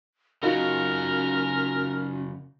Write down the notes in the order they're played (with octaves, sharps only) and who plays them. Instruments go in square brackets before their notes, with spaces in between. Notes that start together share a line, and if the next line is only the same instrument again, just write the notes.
[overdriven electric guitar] C#3 F#3 [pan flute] C#4 [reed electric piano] D#4 F4 F#4 [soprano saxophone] A#4